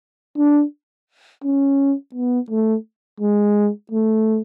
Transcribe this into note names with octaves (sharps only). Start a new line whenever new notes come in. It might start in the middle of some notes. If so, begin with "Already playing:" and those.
D4
C#4
B3
A3
G#3
A3